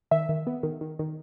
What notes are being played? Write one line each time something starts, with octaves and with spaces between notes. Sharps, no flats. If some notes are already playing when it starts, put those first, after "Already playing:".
D#3 E5
D#3
B3
D#3
D#3
D#3